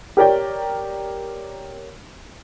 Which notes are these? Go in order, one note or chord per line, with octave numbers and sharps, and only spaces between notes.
G4 A#4 C#5 D5 G5